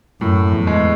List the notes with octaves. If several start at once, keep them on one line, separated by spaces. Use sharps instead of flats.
F#2 A2
E2
G#3